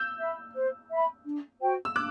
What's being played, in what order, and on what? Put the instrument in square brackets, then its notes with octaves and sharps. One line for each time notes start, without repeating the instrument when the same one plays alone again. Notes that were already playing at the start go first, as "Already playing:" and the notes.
Already playing: [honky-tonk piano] E6 G6
[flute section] E5 B5
C5
E5
B5
D4
F#4 C5 G5
[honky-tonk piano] E6
[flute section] D4 [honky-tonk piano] D6 F#6